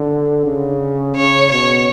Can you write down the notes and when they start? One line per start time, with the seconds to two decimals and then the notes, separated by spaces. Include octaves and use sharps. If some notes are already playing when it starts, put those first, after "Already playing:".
Already playing: D3
0.46 C#3
1.16 C#3 C#5
1.51 B2 C#5